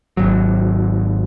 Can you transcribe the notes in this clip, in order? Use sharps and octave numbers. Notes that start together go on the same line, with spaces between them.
G#1 F#3